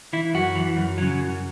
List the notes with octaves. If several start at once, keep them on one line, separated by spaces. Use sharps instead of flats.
E3 E4
F#2 F#4
E3
F#2
C#3 F#3
F#2